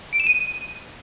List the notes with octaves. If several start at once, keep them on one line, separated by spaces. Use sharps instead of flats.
D7
E7
D#7